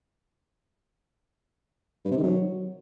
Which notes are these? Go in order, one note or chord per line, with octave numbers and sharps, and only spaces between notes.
G2
C3
D#3
F#3